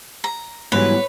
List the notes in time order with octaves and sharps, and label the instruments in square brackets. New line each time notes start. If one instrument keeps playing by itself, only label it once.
[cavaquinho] A#5
[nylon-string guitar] G#2 E3 F#3 [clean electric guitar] G3 B3 [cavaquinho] B4 [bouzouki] C#5